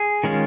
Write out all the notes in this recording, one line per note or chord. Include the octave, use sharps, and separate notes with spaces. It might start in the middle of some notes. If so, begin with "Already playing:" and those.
Already playing: G#4
D#3 G#3 C#4 F4